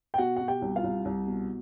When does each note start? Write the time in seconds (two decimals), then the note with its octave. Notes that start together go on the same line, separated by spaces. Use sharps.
0.14 G5
0.18 B2 F#4 F#5
0.37 B2 F#5
0.48 G4 G5
0.62 C2
0.76 F4 F5
0.84 C2
1.05 C2
1.27 B2